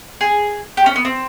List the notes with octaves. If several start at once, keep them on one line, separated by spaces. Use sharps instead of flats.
G#4
G4
C#4
B3
C4